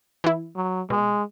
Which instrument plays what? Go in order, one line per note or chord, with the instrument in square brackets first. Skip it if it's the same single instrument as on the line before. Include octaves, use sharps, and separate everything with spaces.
[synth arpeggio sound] E3 E4
[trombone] F#3
[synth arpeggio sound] B2 [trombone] G#3